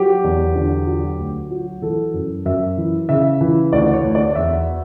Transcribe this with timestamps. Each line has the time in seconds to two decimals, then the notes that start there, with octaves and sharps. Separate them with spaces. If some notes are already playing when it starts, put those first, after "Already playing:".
Already playing: F#3 G4
0.24 E2
0.55 D3
0.87 F#3
1.19 D2
1.50 F#3
1.82 E3 A4
2.14 F#2
2.45 F#2 E5
2.77 E3
3.09 C#3 E5
3.41 E3
3.73 D2 D5
3.93 C#5
4.04 D2
4.15 D5
4.35 E2 E5